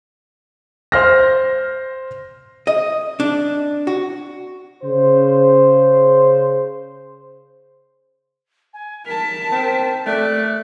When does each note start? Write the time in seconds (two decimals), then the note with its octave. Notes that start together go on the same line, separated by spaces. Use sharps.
0.92 C5 F6 A#6
2.67 D#5
3.20 D4
3.87 F#4
4.82 C#3 C5
8.73 G#5
9.06 A#4 A5 B6
9.51 C4
10.06 A3 D5 F#6